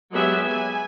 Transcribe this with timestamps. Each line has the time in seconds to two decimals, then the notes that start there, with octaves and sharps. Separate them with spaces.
0.11 F#3 G#3 B3 G4 E5 G#5
0.46 G#5